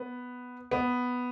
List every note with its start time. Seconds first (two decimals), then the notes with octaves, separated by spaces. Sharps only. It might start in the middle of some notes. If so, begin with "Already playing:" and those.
Already playing: B3
0.71 B3